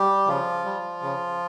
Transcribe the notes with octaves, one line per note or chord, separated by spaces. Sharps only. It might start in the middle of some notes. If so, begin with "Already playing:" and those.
Already playing: G3 G4
C#3 F3 F4
G3
C#3